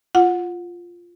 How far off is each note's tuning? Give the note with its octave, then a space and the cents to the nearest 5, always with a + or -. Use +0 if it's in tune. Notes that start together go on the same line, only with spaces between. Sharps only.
F4 +0 F#5 -20